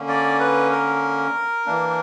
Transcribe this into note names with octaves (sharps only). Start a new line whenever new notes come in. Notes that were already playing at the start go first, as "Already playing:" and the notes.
Already playing: D3 A#3 C#4
D5
B4
A#4
E3 A#3 D4